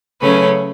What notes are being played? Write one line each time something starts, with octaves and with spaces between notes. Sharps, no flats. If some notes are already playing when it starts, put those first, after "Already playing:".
C#3 F#3 A3 C#4 B4